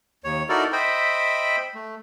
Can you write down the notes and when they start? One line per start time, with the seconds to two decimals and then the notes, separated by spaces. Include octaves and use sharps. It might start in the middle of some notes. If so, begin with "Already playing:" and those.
0.24 D#2 C#5
0.49 D#4 E4 F#4 A4 A#4 D5
0.72 C5 D#5 E5 G5 B5
1.75 A3